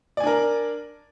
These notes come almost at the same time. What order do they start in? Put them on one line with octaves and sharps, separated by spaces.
D5 G#5 D4 A#4